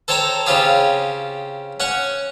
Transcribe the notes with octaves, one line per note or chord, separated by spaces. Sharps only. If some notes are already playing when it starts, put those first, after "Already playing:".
A4 C5 C#5 G5 A5 A#5
C#3 C4 C#4 F4 G4 G#4
C#4 F#5 C#6